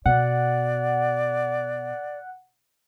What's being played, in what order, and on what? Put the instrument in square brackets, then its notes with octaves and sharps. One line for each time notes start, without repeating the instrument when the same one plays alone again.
[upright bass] B2 [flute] D5 [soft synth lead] F#5